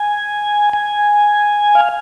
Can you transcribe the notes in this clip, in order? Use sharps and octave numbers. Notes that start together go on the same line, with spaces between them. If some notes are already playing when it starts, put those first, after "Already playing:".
Already playing: G#5
G#5
F5